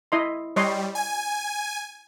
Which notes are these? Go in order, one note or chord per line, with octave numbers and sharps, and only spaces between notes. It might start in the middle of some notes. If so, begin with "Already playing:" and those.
E4 D#5 C6
G3 C#5 D#5 C6
G#5